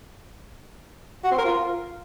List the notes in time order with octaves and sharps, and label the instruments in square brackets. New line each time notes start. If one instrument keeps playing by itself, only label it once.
[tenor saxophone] F#4
C4
A#4
F4